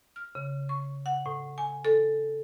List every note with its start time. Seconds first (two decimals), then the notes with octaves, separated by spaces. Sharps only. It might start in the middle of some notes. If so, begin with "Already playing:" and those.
0.16 F6
0.35 C#3
0.69 C#6
1.06 F#5
1.26 A2
1.58 G#5
1.85 A4